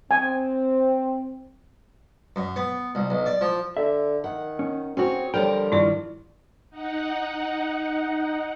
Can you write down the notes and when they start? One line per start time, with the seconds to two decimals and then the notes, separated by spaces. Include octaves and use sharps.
0.11 C4 G#5
2.36 F#2
2.56 B3
2.95 C2
3.10 B1
3.26 D5
3.41 F3
3.77 D3 E5
4.24 D#3 F#5
4.59 C#4
4.97 C4 C#4 F#4 G#4 C#5
5.34 D3 F3 G3 A#4 C5 C#5 G5
5.72 G2 D#3 E4 F4 D5
6.70 D#4 F#5